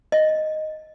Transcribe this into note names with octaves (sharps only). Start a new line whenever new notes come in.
D#5